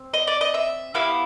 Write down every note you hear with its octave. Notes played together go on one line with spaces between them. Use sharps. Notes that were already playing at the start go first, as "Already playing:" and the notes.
Already playing: C4
D#5
D5
D#5
E5
B3 E4 G4 F5